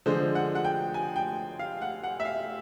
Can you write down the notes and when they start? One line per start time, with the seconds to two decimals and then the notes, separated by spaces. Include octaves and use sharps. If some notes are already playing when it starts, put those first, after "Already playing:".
0.06 D3 F3 G#3 C5
0.35 F#5
0.55 F#5
0.64 G5
0.94 G#5
1.16 G5
1.59 F5
1.82 F#5
2.04 F#5
2.20 E5
2.25 F5